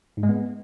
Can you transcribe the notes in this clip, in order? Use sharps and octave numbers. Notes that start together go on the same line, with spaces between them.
G#2
G#3
B3